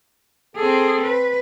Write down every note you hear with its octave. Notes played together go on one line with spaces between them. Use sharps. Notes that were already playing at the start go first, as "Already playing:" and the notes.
C4 G#4 A4
B4